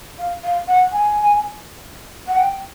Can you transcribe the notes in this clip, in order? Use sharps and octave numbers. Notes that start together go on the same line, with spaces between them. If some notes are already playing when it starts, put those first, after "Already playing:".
F5
F5
F#5
G#5
F#5
G5